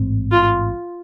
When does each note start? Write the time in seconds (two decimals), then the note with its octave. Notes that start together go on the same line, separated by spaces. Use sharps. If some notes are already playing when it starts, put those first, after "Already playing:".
Already playing: A1 G#2 G#3 C4
0.32 F4